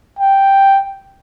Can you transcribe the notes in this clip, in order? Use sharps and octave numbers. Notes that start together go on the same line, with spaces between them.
G5